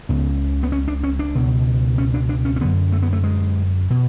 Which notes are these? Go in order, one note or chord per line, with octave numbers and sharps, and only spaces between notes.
C#2 C#3 B3
B3
C#4
D4
C#4
D4
C#2 B2
C#4
D4
D4
C#4
C#4
F#2 D3 B3
A3
B3
A3
G#3
B2